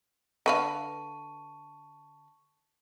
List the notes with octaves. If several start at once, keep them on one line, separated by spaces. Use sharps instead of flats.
D3 B4 F5 A5 C#6 D#7